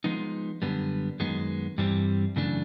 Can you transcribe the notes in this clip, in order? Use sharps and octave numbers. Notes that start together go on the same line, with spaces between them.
F3 G#3 B3 D#4
F#2 D3 G3 B3
F#2 D#3 G#3 B3
G2 E3 G3 C4
F#2 C#3 E3 A3 D4